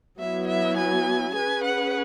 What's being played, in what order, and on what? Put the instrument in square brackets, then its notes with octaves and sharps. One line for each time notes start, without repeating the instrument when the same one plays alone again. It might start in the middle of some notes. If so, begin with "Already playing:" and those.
[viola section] F#3 B3 E4 [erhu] E5
[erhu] E5
G#5
[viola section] C#4 G#4 B4 [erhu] G#5
[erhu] F#5